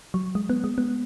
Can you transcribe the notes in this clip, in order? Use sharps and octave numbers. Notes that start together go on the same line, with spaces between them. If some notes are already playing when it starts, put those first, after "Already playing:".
F#3
G#3
B3
G#3
B3